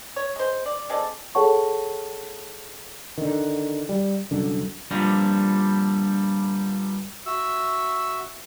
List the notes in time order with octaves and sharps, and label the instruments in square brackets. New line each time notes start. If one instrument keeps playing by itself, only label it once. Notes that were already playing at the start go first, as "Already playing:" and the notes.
[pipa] C#5
G#3 C5
D5
G#3 C4 A4 D5
[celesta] G#4 A4 C#5 F#5 A5 C#6
[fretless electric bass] D3 D#3
G3
C2 F#2 D3
[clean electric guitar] G2 A#2 D3 F3 G3
[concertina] F#4 E5 E6